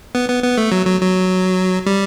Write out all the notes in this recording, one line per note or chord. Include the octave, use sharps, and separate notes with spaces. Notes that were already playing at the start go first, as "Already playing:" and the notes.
B3
B3
B3
A3
F#3
F#3
F#3
G3